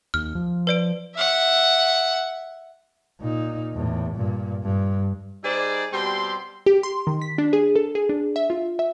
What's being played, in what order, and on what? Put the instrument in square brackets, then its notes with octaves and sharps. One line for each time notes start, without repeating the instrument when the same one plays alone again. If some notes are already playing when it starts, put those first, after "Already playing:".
[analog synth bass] D#2 [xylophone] F6
[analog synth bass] F3
[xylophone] B4 D5 D7
[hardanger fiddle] E5 F#5
[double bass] A#2 D#4
E2 A2
G2 A#2
G2
[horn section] G3 D#4 G#4 C5 D5
B2 G3 C4 G4 C6
[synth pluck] G4
C6
D#3
B6
D4
G#4
A4
G#4
D4
E5
F4
E5